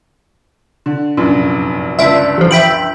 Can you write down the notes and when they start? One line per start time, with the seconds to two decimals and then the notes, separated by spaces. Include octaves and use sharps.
0.86 D3
1.17 F1 A#1 F#2
1.99 G1 C#2 D4 E5
2.38 A1 F3
2.51 E5 G5 B5